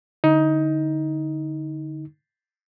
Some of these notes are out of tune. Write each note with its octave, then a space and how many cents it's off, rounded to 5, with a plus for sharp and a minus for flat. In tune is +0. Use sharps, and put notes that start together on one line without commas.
D3 +5 D#4 +20